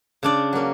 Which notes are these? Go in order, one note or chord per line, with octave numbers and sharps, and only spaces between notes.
C#3 D4 D5
F#3 A#3 C#4